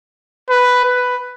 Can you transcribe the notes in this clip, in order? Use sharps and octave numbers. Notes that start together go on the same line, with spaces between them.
B4
B4